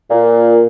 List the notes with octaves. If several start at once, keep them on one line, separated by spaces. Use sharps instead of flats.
A#2